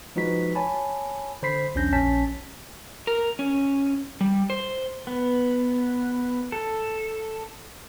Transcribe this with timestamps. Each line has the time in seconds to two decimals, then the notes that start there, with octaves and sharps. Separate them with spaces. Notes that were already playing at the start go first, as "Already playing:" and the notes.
0.16 F3 G#3 D#4 F#4 B4 B6
0.55 C#5 G#5 A5 B5
1.43 D3 C5 B5 B6 C7
1.75 B1 E2 C#4 D4 G6 A#6
1.92 A#1 C#4 A5 B6
3.07 A#4
3.39 C#4
4.21 G3
4.50 C5
5.07 B3
6.52 A4